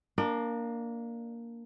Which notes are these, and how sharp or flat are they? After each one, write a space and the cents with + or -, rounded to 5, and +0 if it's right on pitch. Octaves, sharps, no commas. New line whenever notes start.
A#3 +0 D4 -10 D5 +40